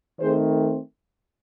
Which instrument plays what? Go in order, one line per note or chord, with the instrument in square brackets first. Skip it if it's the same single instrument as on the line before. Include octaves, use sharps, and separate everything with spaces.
[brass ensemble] D#3 A3 C4 G#4 C5